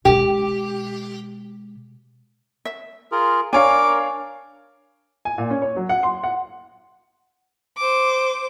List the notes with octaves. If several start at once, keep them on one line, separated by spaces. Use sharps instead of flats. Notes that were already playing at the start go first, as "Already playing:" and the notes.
B2 G#3 G4
E5
F4 G#4 A#4
D4 A#4 C#5 F5 G#5 D6
G#5
A#2
C#4
C#5
F#3
F#5
C6
F#5
C5 D6